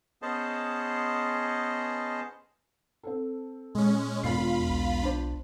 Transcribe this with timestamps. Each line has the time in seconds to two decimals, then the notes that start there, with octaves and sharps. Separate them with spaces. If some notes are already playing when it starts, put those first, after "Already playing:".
0.22 B3 C#4 G#4 C5 D#5 A5
3.03 C4 A4
3.75 A#2 G#3 C#4
4.24 E1 E2 F4 B5 C7
4.70 B1
5.03 D4 C5